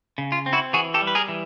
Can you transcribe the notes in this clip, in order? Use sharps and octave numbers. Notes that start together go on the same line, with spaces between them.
C#3
F4
C4
E4 F#4
E3 F#4 G#4
G4 A4
G3
B4
G#4 A#4
E3